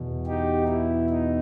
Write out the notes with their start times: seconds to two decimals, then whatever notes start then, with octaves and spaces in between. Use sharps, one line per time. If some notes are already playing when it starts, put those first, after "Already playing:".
Already playing: E2 B2
0.27 D#4 G4
0.68 E4
1.10 D#4